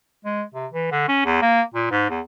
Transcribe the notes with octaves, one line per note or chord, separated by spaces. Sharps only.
G#3
C3
E3
D3
C#4
E2
A#3
A#2
G#2
E2